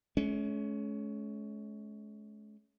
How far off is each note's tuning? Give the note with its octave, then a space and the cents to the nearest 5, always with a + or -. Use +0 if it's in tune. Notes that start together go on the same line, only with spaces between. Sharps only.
G#3 +45 C#4 +10